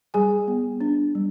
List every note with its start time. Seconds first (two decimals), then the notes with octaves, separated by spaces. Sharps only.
0.14 G3 G#4 G#5
0.48 B3
0.81 D4
1.15 G3